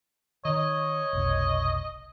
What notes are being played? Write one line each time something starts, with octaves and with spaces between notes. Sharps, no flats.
D#3 C#5 D#5
F1 B1